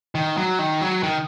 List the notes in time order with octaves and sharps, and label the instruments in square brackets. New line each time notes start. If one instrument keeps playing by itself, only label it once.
[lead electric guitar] D#3
F#3
D#3
F#3
D#3